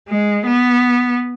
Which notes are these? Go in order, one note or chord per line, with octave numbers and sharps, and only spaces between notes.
G#3
B3